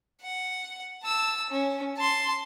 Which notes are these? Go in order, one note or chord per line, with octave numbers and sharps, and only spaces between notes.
F#5
A5 E6
C#4
A5 C6